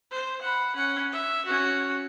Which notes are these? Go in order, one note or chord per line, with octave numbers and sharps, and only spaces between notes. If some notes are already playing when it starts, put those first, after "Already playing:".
C5
F#5 B5
C#4 F#5
E5
C#4 F#4